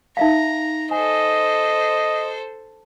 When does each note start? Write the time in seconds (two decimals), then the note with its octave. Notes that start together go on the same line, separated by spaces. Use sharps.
0.17 D#4 E5 F5 A#5
0.91 A4 C5 D#5 G#5